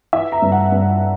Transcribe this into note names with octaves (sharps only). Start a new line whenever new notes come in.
E3 E5
A#5
G2
F#5
G2